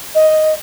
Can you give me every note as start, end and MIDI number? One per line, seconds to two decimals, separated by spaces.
0.14 0.53 75